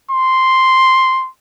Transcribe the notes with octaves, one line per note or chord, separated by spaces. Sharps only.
C6